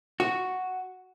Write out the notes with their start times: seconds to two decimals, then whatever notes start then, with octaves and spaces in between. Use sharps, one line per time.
0.20 F#4